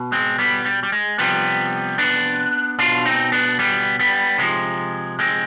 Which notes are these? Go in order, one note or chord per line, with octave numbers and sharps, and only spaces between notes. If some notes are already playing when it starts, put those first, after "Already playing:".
Already playing: B2
G#3 C4
G3 B3
G3
G3
G#3
C3 F3 G3 B3
B3 D4
B2 D4 F4
C4 D#4
B3 D4
G3 B3
G3 B3
C3 F3 G#3
G#3 C4